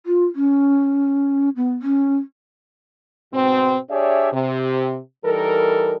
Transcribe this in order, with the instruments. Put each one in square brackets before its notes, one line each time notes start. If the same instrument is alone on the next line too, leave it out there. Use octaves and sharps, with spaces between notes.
[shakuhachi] F4
C#4
B3
C#4
[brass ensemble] G#2 B2 C4
D4 G4 G#4 C#5 D5 E5
C3
E3 G3 D#4 A4 A#4